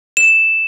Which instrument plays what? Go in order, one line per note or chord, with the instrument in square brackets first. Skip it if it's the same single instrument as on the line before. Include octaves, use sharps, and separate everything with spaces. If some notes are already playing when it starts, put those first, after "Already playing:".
[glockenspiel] E7